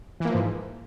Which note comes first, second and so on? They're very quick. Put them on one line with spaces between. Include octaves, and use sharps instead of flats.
E3 A#3 F3 G#2